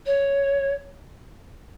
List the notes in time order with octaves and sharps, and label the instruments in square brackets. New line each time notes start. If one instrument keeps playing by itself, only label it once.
[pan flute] C#5